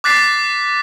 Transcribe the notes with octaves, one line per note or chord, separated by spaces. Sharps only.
D6 F#6 A6 B6 C7